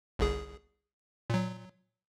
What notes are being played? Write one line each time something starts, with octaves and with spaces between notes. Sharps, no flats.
G1 C2 G#4
A#2 F#3